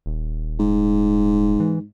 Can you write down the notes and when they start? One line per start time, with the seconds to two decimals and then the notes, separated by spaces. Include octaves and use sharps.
0.06 D#1
0.59 G#2
1.60 E3